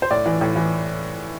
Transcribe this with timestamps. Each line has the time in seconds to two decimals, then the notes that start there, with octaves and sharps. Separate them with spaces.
0.02 C5
0.11 A2 D5
0.26 E3
0.41 A2
0.56 E3